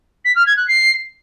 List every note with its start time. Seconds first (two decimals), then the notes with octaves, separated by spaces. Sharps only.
0.24 B6
0.35 F6
0.46 G#6
0.56 F#6
0.67 C7